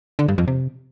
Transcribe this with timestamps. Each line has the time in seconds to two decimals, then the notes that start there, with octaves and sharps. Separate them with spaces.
0.19 D3
0.28 G2
0.38 F2
0.48 C3